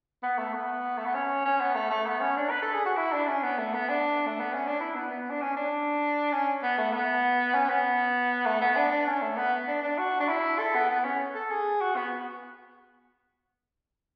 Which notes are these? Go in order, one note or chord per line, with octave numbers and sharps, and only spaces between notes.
B3
A3
B3
A3
B3
C#4
C#4
B3
A3
A3
B3
C#4
D4
B4
A4
G#4
F#4
E4
D4
C#4
B3
A3
B3
D4
A3
B3
C#4
D4
E4
B3
B3
D4
C#4
D4
C#4
B3
A3
B3
C#4
B3
A3
B3
D4
D4
C#4
A3
B3
D4
D4
F#4
D4
E4
A4
B3
B3
C#4
A4
G#4
F#4
B3